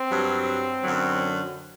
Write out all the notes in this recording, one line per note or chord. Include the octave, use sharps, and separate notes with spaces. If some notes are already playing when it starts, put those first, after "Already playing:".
Already playing: C4
G2 F#3
F#2 D3 F#3